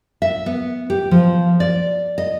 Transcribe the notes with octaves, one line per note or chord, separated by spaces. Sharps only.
E5
B3
G4
F3
D5
D#5